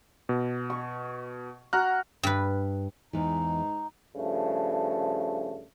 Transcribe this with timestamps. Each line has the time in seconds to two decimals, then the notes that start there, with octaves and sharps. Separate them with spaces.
0.29 B2
0.70 C#6
1.73 F#4 A#5 F6 F#6
2.23 G2 B4
3.13 E2 G#2 E3 D#4
4.15 G2 C#3 F3 A3